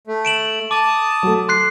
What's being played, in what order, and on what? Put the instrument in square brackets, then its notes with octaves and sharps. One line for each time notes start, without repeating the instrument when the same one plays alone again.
[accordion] A3
[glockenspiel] D7 E7 F#7
[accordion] A5 D#6 [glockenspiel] D6
[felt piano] F#3 A3
[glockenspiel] C6 F#6 C7